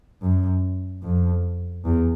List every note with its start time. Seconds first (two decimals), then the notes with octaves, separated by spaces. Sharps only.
0.22 F#2
1.03 F2
1.85 E2